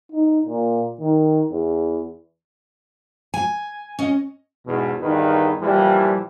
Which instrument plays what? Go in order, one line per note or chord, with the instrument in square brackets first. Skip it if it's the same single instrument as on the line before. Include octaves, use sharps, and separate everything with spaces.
[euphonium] D#4
A#2
D#3
E2
[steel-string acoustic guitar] G#5
C#4 D#5
[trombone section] E2 G#2 B2
E2 G2 D#3 D#4 B4
A#2 E3 F3 G3